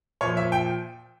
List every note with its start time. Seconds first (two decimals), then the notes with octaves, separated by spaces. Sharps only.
0.21 A#2 F3 C#5
0.37 E5
0.52 G5